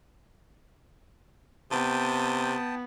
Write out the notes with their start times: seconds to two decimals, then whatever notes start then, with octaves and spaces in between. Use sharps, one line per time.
1.71 C3 B3 G5 A5 D#6